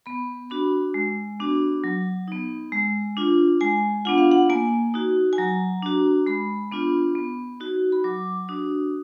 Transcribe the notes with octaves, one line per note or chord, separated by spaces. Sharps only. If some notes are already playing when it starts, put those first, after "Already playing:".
B3 B5
D4 F#4 B5
G#3
B3 D4 F#4
F#3
B3 D#4
G#3
D4 F4
G#3 G#5
B3 D4 F4 F#5
F5
F#5
A#3 G#5
D#4 F#4
G#5
F#3 A#5
D4 F#4
G#3 B5
B3 D4 F4
B3
D#4 F#4
B5
F#3 D6
D4 F#4 D#6